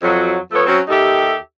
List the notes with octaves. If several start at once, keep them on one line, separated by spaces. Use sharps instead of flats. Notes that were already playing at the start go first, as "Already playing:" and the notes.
F2 F#3
F3 A3 B3 A4 C#5
F#3 C4 C#4
D#2 D#4 G4 A4 E5